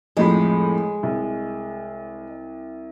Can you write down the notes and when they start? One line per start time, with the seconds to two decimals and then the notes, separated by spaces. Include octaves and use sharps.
0.17 F2 A2 G#3 B5
1.03 C2